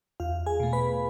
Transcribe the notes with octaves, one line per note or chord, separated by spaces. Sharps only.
E2 F4 F5
G#4 G#5
B2 A3
B4 B5